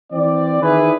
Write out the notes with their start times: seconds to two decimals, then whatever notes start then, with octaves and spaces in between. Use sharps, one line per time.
0.12 E3 C4 D5
0.62 D#3 E4 G#4 B4